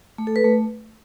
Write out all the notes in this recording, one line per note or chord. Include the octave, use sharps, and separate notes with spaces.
A3
A4
B4
A3